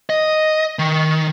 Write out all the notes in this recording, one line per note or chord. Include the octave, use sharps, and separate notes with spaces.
D#5
D#3